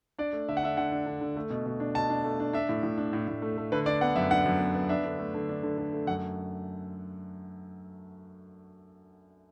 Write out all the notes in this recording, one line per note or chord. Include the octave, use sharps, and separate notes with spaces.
D4 D5
A3
D3 E5
F#5
D4 E5
D3 F#5
D4
D3
D3
A3
B2
B2
D4
B2 A5
D4
A3
D4
D4 E5
A2
A2
D4
A2
A2
A3
A3
D3 B4
D4 D5
B3 F#5
F#2 E5
D4 F#5
F#2
B3
B3
D4 E5
D3
A3
D3
D4
D3
D3
A3
F#2 F#5